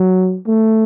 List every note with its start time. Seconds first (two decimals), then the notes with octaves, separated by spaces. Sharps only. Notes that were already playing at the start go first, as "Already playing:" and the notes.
Already playing: F#3
0.48 A3